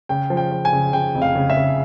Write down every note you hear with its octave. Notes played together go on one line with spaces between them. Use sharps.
C#3 G5
F3
G5
F3
G#5
C#3
C#3 G5
F1
F5
C#3
E5
C#3